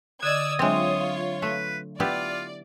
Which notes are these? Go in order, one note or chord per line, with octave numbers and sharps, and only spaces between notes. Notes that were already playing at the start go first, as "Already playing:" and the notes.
D3 D5 D#5 D#6 E6 G#6
F#3 G#3 C4 D4 F4 C#5 E5
A3 B4
B3 E4 F4 G4 D5